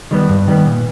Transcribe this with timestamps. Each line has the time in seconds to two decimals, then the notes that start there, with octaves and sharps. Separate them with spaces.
0.11 D#3 G3 B3
0.29 G2
0.47 D#3 G3 B3
0.66 A#2